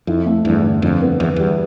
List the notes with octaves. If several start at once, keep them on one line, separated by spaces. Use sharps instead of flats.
F2 E4
A3
E2 G2
D3
F2 D3
B3
E2 D3
E2 G3